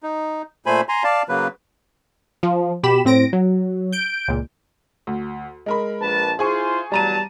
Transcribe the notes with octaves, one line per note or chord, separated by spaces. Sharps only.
D#4
A#2 A3 C5 G#5 B5
G#5 A#5 C6
D5 F5 A5
C#3 F#3 A#3 B4
F3
B2 G4 B5 E7
A2 C4 A#6 D7
F#3
G6 D7
C#2 A#2
D2
G#3 A#4 B5
A#1 B4 A5
E4 F4 G#4 C5 G#5 C#6
E2 F#3 G3 A5 A#5 D#7